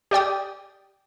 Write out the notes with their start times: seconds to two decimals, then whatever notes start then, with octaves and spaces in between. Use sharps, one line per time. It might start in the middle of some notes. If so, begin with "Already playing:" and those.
0.11 G4 D5 G5 D#6